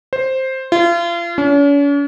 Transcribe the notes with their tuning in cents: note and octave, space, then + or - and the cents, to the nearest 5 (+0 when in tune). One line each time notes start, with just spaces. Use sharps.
C5 +5
F4 -35
C#4 +45